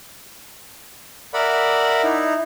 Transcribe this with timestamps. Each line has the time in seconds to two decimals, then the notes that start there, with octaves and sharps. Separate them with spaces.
1.34 A#4 D5 E5 F#5 B5
2.03 D#4 E4